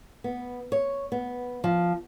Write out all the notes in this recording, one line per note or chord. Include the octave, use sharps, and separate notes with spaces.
B3
C#5
B3
F3